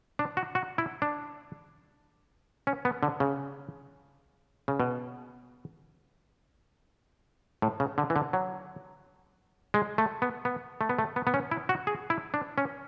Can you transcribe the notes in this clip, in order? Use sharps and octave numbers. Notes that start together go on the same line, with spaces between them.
D4
F#4
F#4
E4
D4
C#4
B3
D3
C#3
C#3
B2
A2
C#3
D3
E3
D3
F#3
G#3
A3
B3
B3
A3
B3
A3
B3
B3
C#4
E4
F#4
G#4
E4
D4
C#4